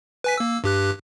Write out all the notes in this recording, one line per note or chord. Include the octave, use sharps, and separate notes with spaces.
B4 G#5 B6
A#3 E6
G2 G4 F#6